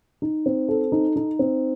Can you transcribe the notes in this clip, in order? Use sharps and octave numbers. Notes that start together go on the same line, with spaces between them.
D#4
C4
A4
D#4
D#4
C4